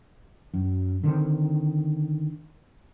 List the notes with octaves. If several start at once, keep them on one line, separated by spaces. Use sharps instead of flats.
F#2
D3 D#3 G#3 C4